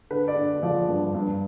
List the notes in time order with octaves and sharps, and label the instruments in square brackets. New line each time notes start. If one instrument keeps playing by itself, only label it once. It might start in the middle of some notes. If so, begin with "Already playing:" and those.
[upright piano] D3 B4
D5
D3
F3 D5
G2
G2